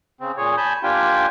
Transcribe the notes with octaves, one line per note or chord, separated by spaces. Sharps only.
C#3 C4
A#2 G#4 C#5
G#5 A5 B5 G6
A#3 D4 F4 G4 G5 G#5